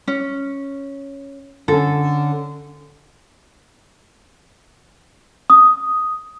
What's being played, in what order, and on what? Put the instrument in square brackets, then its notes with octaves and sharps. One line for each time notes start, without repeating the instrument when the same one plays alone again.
[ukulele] C#4
[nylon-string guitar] D3 C#4 [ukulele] A4
[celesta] D#6